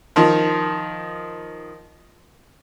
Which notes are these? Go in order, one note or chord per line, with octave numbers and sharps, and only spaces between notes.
D#3 F3